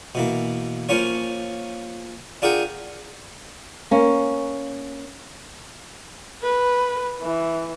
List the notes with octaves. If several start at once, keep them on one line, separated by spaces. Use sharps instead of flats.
B2 E3 A#3
F3 A#3 C#4 F4 C#5
D4 F4 G#4 A#4 F#5 G5
A#3 C#4
B4
E3